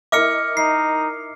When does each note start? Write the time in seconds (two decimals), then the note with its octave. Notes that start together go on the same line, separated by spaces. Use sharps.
0.12 E4 A#4 D#5 D6 F6 C#7
0.57 D#4 C7